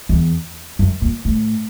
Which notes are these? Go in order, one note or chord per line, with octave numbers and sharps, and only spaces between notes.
E2
F#2
A#2
A2